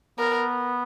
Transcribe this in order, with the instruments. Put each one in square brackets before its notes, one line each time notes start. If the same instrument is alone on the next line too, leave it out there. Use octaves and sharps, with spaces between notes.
[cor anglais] B3 [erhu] A#4